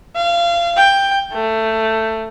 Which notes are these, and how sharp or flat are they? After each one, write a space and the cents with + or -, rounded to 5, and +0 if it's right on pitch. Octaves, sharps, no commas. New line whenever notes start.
F5 -25
G5 +10
A3 +15